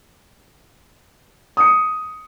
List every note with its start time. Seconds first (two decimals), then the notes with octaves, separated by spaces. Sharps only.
1.57 D#6 C#7